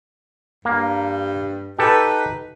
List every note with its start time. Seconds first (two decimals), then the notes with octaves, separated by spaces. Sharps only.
0.65 G2 A#3
1.79 D#4 G4 A4 B4